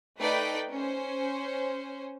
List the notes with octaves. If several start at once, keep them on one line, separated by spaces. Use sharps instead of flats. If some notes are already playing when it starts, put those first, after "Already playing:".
A3 D#4 B4 D5 G5 B6
C#4 C5